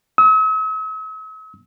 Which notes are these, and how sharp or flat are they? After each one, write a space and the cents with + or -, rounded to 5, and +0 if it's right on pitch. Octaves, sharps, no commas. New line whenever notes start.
E6 -45